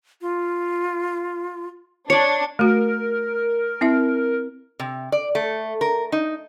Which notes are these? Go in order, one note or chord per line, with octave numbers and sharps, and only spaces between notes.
F4
D4 C#5 D5 C#7
A3 F#4 A#4
C4 E4 E5
C3
D5
A3
A#4
D#4